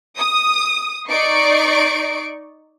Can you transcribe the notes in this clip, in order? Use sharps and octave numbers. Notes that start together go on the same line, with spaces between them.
D#6
D#4 D5 C#6 C7 D7